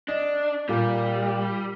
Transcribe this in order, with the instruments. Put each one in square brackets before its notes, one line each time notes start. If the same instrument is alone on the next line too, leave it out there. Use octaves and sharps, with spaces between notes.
[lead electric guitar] D4 [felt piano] D#5
[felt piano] A#2 A#3 [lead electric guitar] G3